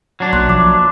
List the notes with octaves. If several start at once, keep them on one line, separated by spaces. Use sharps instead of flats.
F#3 D4
B1 A#3 C6 F#6
F3 D6